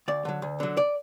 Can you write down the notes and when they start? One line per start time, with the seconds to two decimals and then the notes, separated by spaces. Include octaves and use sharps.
0.08 D2 D5
0.25 D3 F#3
0.42 D2
0.60 D3 F#3
0.77 D5